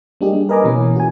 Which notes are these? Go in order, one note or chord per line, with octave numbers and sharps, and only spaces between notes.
G3 A#3 D4 D#4 G4 G#4
G3
A#4 B4 D#5 G#5 A#5 D6
B2 E3 A#3 C#4
F#4 G#5